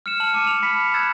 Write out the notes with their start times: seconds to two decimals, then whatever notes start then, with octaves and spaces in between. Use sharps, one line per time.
0.06 F6 C#7 E7
0.20 A5 F6 F#7
0.33 A5 D6 F6 C#7 D#7
0.47 F7
0.63 B5 B6 C#7
0.94 E6 F#6 G#6 A6 E7